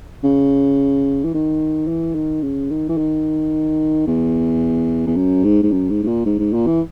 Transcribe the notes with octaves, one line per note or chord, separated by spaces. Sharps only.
C#3
E3
D#3
E3
D#3
C#3
D#3
E3
D#3
E2
E2
F#2
G#2
G#2
F#2
G#2
G#2
A#2
G#2
G#2
A#2
E3